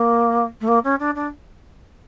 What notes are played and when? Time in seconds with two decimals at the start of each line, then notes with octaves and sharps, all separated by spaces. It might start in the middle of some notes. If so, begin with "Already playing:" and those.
Already playing: A#3
0.61 A3
0.68 A#3
0.84 C#4
1.00 D4
1.15 D4